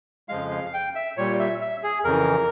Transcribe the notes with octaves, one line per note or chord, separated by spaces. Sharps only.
F2 C#3 F3 G#3 F5
F5
G5
E5
A#2 G3 C#5
E5
E5
G#4
F2 C#3 E3 A#4